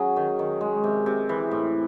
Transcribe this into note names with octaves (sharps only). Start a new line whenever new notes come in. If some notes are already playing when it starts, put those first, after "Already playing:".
Already playing: F#3 C#4 G#4
D#3
D#3
G#3
C3
C3
E3
A2